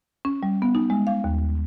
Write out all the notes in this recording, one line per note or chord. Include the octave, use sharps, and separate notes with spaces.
C#4
G3
B3
D#4
G#3
F5
D#2